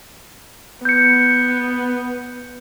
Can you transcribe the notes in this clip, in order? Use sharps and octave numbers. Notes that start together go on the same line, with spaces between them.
B3 G6 C#7